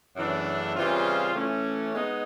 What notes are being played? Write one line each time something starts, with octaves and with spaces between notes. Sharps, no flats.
F#2 C#3 E3 A3 D4
C#3 E3 G3 C4 F4
E3 A3 C#4
G#3 B3 D#4